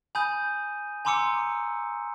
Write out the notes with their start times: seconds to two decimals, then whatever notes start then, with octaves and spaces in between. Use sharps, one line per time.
0.15 G#5 B5 D#6 G6 D#7
1.05 G#5 A#5 C6 D6 E6 C#7